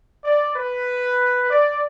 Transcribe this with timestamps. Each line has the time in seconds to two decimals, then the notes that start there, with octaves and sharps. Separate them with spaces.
0.24 D5
0.55 B4
1.49 D5